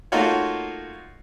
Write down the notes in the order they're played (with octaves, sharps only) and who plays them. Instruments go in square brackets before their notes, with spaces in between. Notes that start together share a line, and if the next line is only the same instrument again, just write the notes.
[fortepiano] A3 A#3 D#4 F4 F#4 C#5